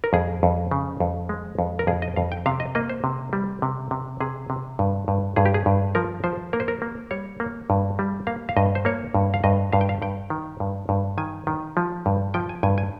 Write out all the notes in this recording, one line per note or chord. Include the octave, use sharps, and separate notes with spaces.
A#4
F2 G#4
F2
C#3
F2
G#3
F2
A#4
F2 G#4
D#5
F2 F5
G5
C3 F5
D#5
A#3 D#5
C5
C3
G3
C3
C3
C3 G#4
C3
G2
G2
G2 G#4
G4
G#4
G2
F3 A#4
F3 C5
A#3 A#4
C5
A#4
A#3
G3 C#5
A#3
G2
G3
A#3 F5
F5
G2 D#5
C5
A#3 C#5
G2
F5
G2 D#5
G2 F5
G5
F5
G2 G5
D#3
G2
G2
D#3 G#5
D#3
F3
G2
F3 G5
G#5
G2 G#5
G#5